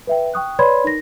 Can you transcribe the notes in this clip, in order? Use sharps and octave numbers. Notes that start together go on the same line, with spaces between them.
B4 E5 G5
G5 C#6 D#6 F#6
B4 C#5 D5 B5 C6 G#6
D#4 A#4 A#6